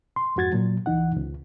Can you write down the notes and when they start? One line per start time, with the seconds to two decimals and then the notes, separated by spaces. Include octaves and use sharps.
0.16 C6
0.36 F2 G#2 F#4 G#6 A6
0.53 A#2 F#3
0.86 C#2 E3 D#4 F#5
1.17 C#2